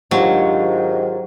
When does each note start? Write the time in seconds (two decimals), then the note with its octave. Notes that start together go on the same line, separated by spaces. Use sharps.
0.11 G#2 D#3 F#3 D4 F4 G4